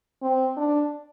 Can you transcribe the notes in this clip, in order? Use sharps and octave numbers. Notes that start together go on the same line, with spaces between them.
C4
D4